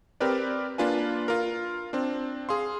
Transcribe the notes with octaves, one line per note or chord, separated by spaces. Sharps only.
C4 G4 A#4 B4 D5
A#3 D4 F4 B4 G#5
F4 A#4
C4 D4
G#4 F5 C6